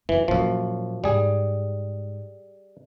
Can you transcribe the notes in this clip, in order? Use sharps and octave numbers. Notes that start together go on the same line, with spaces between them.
F#2 E3
F#2 A#2 F3 G3
G#2 G3 G#4